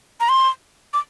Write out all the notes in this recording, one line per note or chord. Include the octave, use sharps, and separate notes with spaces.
A#5
C6
D6